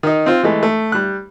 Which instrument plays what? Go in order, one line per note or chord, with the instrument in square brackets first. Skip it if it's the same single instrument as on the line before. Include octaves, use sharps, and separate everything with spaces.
[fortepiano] D#3 D#4
C4 F4
E3 G#3 A3
A3
G3 F#6